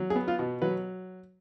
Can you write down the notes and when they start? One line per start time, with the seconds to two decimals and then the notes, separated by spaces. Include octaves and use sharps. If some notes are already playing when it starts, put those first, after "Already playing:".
Already playing: F#3
0.10 G#4
0.16 B3
0.28 F4
0.39 B2
0.62 F#3 B4